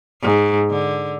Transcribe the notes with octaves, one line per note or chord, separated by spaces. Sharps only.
G#2
D3